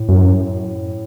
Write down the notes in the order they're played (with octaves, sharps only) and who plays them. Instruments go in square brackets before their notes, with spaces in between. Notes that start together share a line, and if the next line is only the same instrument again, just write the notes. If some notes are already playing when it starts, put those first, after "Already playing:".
Already playing: [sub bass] A2
[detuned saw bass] F#2